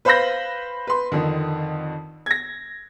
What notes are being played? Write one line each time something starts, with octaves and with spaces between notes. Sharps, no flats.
B4 C5 F5 B5 G6 A#6
B4 C6
F2 D3 D#3
G#6 A#6